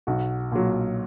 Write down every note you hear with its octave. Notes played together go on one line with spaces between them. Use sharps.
B1 F#4
A#2 F#3